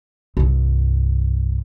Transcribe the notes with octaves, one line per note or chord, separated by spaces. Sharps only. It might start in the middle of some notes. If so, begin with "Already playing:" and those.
C2 G2